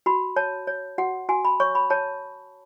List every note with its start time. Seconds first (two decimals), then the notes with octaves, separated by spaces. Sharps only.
0.06 F#4 B5
0.36 C#5 A5
0.67 C#5
0.98 F#4 F#5
1.29 F#4 G#5
1.45 B5
1.60 C#5 C#6
1.75 B5
1.90 C#5 A5